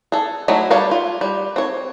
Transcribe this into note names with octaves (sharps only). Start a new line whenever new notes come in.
G#4 A4
F#3 G#3 A3 B3 E4
G3 B3 C#5 D5 F5
F4
G3
C4 C#5